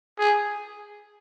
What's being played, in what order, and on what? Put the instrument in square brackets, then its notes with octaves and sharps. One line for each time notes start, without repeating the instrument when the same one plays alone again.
[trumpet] G#4